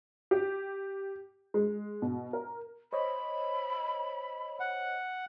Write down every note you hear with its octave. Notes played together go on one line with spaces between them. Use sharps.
G4
G#3
B2
A#4
C5 C#5 D#5 B5
F#5